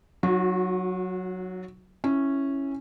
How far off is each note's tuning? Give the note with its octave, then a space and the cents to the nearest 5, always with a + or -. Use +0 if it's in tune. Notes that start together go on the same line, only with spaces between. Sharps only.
F#3 +0 D#4 +0 F#4 -35
C#4 -10 E4 +0